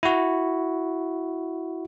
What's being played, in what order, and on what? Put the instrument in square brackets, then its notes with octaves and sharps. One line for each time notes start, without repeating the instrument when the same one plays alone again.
[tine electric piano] E4 F#4